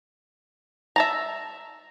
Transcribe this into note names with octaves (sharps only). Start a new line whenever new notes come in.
E5 A5 A#5